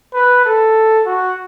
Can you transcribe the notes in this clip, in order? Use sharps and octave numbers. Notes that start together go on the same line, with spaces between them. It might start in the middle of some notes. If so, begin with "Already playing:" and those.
B4
A4
F#4